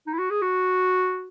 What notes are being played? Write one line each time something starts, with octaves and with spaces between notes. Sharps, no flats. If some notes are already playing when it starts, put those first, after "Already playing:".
D#4
E4
F#4
G#4
F#4